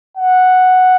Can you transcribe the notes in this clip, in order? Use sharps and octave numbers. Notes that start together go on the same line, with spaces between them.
F#5